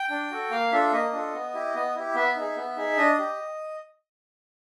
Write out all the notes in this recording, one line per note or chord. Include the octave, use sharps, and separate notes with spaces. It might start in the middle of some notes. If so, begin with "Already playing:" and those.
Already playing: G5
D4
F#4 A4
A#3 F5
D4 F4 A4 E5
A#3 D#5
D4 F4 A4
B3
E4 G4
B3 D#5
E4 G4
B3 E5
D#4 G#4
B3
D#4 G#4
D4 D#5
G4